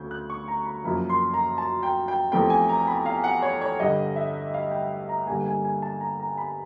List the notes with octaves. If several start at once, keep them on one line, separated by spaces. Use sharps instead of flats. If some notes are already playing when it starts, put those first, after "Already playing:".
Already playing: D2 C#3 G6
F#6
C#6
A#5
B5
F#2 C#3 F3 A#3 B5
C6
A#5
A5
G5
G5
E2 C3 F3 A3 C4 G5
G#5
A#5
B5
F5
F#5
C#5
C#5
G2 D3 G3 D#5
E5
F5
G5
A#5
G2 D3 G3 A#3 G#5
G#5
G#5
A5
A#5
A#5
B5